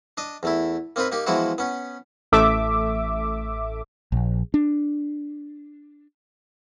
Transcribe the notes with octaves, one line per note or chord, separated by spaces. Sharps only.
D4 D#5
E2 A3 E4
A#3 C4 D#4 F4 B4
A#3 D#4 G4
E3 F3 G#3 B3 E4 F#4
B3 C#4
A1 A3 E5 D6
A#1
D4